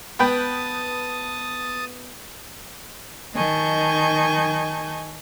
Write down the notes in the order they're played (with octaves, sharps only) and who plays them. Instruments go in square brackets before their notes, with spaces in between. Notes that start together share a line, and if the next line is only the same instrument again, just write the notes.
[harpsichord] B3 [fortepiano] B4 G5 B5 [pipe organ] A5 D#6
[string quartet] D#3 D#5 G#5 A5 C#6 G6